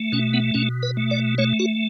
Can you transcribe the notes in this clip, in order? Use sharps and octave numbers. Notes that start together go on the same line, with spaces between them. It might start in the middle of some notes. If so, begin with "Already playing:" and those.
Already playing: A3
B2 C#4
B3
B2 C#4
B4
A3
D5
A3 C#5
F#4